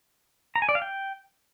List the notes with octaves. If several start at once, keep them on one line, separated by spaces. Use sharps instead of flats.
A#5
G#5
D5
F5
G5